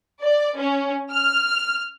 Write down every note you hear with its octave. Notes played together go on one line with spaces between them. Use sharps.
D5
C#4
F6